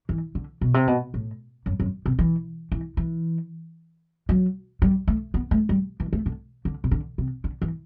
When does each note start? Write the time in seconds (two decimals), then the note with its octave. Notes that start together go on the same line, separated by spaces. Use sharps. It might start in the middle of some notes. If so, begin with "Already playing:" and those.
0.09 E3
0.35 D3
0.61 B2
0.74 C3
0.87 B2
1.14 A2
1.66 F#2
1.80 F#2
2.06 C3
2.19 E3
2.72 E3
2.97 E3
4.29 F#3
4.82 G3
5.08 A3
5.34 B3
5.51 A3
5.69 G3
6.00 E3
6.13 A3
6.26 D3
6.65 D3
6.84 C3
6.91 D3
7.18 C3
7.44 D3
7.62 E3